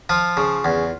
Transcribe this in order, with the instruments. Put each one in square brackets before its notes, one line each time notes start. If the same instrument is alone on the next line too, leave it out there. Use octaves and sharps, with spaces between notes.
[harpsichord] F3 F4
C#3
E2